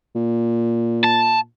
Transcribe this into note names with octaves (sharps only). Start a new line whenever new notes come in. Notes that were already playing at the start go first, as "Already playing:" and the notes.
A#2
A5